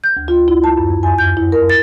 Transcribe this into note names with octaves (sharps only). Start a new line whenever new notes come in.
G6
D2
F4
E4
A5
F#2
F2
G#5
G6
E4
A#4
A6